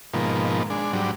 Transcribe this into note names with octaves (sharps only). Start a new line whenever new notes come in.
G#2 B2 D#3 F3 A#3
G#3 D4
G#2 F#3 G3 D4